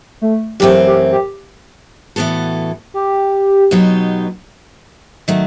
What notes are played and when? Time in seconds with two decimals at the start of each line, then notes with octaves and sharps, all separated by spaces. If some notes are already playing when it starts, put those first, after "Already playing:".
0.22 A3
0.60 F#2 E3 A3 C4 G4
0.87 G4
1.12 G4
2.16 A2 E3 B3 F#4 A4
2.94 G4
3.71 B2 F#3 B3 D#4 G4
5.28 D#3 F#3 A3